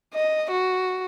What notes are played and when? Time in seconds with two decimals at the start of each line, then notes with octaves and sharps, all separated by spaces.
0.14 D#5
0.51 F#4